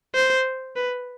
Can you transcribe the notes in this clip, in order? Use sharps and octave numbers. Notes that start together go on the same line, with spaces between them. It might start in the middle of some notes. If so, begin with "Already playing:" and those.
C5
B4